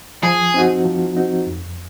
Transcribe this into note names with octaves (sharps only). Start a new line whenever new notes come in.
F3 G#4
C4 D#4 F#4
F3
C4 D#4 F#4
F2